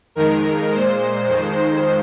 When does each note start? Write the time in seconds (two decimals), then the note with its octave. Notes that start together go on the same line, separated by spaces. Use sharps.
0.15 F2 D#3 G#3 A#4
0.71 A#2 G#3 C5
1.27 F2 D#3 G#3